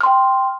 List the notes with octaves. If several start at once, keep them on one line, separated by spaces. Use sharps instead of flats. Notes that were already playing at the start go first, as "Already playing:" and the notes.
G5 C6 F6